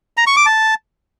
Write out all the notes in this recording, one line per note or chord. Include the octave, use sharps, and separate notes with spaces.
A#5
C#6
D6
A5